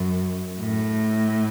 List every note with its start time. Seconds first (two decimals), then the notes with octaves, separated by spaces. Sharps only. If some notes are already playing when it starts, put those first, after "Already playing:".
Already playing: F#2
0.60 A2